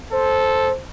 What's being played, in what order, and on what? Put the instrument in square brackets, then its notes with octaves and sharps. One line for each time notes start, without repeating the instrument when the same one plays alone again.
[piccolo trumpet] A4 [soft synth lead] C5